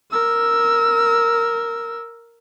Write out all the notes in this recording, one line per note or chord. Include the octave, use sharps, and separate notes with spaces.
A#4 E6